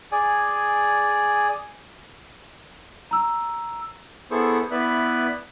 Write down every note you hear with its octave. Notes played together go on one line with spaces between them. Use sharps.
G#4 D5 G#5
A#5 E6
B3 E4 G#4 A4 C5 C#6
B3 E4 B4 D5 E5 F#6